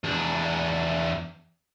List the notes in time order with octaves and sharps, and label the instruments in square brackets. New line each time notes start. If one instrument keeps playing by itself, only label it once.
[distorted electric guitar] E2 D4